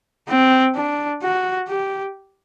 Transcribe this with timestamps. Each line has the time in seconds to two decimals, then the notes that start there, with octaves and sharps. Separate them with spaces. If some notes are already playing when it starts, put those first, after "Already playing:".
0.29 C4
0.76 D4
1.22 F#4
1.69 G4